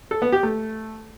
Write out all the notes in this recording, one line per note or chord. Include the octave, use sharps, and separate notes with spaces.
A4
B3
G4
A3